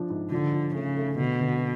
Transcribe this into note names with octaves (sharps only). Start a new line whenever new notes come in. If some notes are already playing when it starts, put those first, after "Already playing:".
Already playing: F3 D4
G#2
D3 F3
F3
C#3 A3
A3
B2 D3
D3